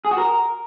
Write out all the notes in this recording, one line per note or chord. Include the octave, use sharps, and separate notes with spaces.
G#4
F#4
A#4